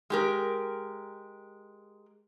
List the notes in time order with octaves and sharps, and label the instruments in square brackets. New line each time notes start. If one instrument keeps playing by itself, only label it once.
[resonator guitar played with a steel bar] G#3 G4 A#4